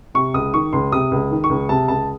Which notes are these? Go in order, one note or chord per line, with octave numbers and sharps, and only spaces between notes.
C3 C#6
C#2 D#6
D#3 C#6
C#2 C6
C3 D#6
C#2
D#3
C#6
C#2
C3 A5
C#2 A5